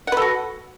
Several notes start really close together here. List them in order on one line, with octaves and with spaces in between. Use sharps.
F#5 B4 A4 F#4